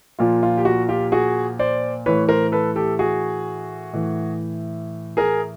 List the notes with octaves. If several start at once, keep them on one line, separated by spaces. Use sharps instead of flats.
A#2 F3 F4
F4
G4
F#4
F4 G4
F#4 G#4
C5 D5
A2 E3 B4 C#5
A#4 C5
A4 B4
G4 A4
F#4 G#4
A2 E3
G#4 A#4